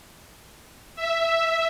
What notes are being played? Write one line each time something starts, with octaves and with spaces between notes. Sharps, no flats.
E5